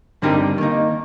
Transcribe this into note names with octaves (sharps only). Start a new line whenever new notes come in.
G2 D3 G3 C4 D#4 G4 A#4
D#3 A#3 D#4